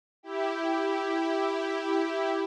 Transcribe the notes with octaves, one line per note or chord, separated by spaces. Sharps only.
E4 G4